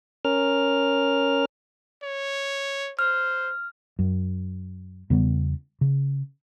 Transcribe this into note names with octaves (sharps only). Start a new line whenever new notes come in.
C#4 A#4 F6
C#5
C5 F6
F#2
E2 C#3 G3 B3
C#3